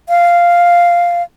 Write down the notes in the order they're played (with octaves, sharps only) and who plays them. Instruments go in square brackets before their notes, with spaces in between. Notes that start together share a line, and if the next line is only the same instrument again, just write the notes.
[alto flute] F5